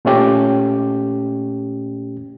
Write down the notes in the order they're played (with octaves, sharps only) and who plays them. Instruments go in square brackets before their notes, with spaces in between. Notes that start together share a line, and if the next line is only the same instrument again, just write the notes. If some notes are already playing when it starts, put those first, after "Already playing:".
[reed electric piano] A#2 A3 C#4 G4